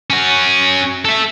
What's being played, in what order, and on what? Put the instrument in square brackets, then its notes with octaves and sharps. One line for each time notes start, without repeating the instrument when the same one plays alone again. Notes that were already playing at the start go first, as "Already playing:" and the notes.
[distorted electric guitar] C#4 F#4
A4 E5